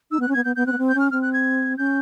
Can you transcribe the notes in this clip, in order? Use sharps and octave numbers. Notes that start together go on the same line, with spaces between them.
D#4 E6
B3 F#6
C#4
B3 G#6
B3 G6
B3 G6
C4 F#6
B3
C4
G6
C#4 F6
C4 F6
F#6
G#6
C#4 G6